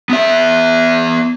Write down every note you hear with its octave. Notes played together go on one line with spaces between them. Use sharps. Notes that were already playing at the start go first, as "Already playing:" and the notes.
B3 E5